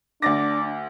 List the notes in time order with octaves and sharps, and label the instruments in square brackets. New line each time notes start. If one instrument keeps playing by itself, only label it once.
[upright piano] D2 A6 A#6 [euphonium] D4 [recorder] D6